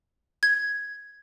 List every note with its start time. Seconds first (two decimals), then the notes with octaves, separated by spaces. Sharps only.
0.43 G#6